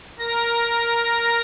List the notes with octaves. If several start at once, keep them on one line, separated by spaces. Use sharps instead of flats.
A#4 A#6